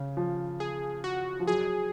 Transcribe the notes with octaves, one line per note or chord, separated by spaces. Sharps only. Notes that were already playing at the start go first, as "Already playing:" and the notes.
Already playing: C#3
F3
G#4
F#4
F3
F#3 G#4